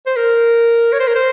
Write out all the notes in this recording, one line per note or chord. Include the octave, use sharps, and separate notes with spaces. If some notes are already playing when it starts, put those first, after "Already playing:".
C5
A#4
C#5
C5
A#4
C5